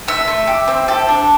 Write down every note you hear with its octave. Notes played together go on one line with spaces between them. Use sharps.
A3 E5
A3
G4
C4
G4 A4
D4